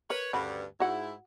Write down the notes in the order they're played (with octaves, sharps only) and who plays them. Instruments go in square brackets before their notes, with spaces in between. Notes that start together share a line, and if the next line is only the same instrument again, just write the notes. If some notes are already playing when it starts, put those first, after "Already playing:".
[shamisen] A#4 [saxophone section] B4 C#5
[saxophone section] D2 G2 [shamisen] C#3 F#4 B5
[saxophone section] G#2 E4 [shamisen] F#4 F#5